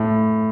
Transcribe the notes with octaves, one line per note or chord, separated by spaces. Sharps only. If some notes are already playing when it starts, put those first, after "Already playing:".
Already playing: A2